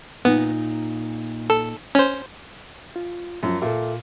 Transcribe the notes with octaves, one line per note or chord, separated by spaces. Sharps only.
A#2 B3 D#4
A4
C#4 C5
F4
F#2 F3
A#2 A4 E5